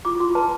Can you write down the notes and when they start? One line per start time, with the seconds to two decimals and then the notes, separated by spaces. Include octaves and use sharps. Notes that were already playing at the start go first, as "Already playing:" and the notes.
0.05 F4 D6
0.20 F4 C6
0.35 B4 A5